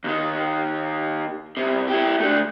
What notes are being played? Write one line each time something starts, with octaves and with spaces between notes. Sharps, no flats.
D#2 D#3
C2 C3
E4 G4
A3 D4